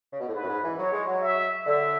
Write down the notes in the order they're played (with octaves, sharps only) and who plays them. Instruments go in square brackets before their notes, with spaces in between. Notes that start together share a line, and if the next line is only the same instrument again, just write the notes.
[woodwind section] C#3
B2
A2
[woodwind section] G#2 [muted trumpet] B4
[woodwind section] F#2
G#2
E3
[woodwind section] F#3 [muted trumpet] C#5
[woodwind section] G#3
F#3
[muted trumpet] E5
[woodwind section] D3 [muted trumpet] E5